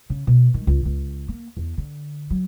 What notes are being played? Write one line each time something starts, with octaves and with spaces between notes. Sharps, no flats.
C#3
B2
D#3
C#2
C#2
A#3
E2
D3
F#3